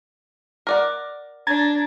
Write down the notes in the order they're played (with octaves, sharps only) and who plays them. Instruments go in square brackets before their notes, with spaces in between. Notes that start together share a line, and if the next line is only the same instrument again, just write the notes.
[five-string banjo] A#4 D5 F#5
[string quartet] D4 [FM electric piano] A#5 G#6 A6